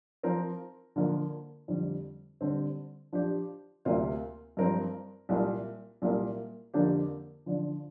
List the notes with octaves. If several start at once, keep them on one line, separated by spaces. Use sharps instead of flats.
F3 C4 A#4
D3 F3 A#3
F2 D3 G3
D3 G3 C4
F3 D4 G4
D2 C3 A#3 F4
G2 F3 C4 A#4
C2 A#2 A#3
C2 A#2 A#3
F2 D3 A#3 D4 G4
D3 F3 D4